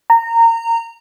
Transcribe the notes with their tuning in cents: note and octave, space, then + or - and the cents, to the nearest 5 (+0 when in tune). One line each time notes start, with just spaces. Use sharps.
A#5 -20